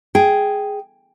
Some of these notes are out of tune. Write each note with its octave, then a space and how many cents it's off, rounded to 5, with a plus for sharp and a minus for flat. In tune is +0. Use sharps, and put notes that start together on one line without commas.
G#4 +0 G5 +0